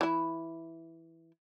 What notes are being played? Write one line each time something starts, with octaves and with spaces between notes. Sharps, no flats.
E3 E4